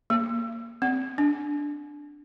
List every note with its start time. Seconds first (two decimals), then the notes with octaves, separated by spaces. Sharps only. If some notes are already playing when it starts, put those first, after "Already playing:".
0.10 A#3
0.82 C4
1.18 D4